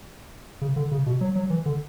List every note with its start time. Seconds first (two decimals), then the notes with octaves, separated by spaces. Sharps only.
0.61 C#3
0.76 D3
0.91 C#3
1.06 B2
1.21 F#3
1.35 F#3
1.50 E3
1.66 D3